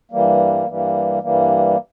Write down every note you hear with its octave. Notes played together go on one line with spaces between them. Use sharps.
G2 E3 G3 A#3
G2 E3 G3 A#3
G2 E3 G3 A#3